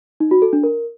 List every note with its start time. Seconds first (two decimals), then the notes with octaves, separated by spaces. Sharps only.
0.20 D#4
0.31 F#4
0.42 A4
0.53 D4
0.64 A#4